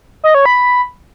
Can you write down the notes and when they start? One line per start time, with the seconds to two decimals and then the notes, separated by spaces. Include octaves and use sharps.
0.24 D#5
0.35 C#5
0.46 B5